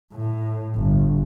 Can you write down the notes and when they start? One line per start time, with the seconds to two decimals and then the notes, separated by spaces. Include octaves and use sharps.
0.13 A2
0.76 G1